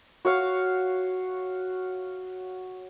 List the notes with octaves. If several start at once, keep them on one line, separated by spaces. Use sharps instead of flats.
F#4 C#5 F5